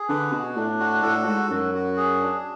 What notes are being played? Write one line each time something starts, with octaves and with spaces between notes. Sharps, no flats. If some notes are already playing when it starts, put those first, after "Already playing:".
Already playing: G#4
D3 B4
B2 F#4
A2 D4
F#4
A2 A4
G#2 F#4
F#2 F#4
F#4
G#4
D4